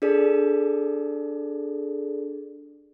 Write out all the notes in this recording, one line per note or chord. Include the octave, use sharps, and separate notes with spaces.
D4 G#4 A4 D5